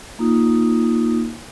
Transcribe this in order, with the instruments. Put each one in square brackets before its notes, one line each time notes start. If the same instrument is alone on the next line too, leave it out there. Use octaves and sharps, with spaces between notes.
[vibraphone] A#3 D#4 F4 D#6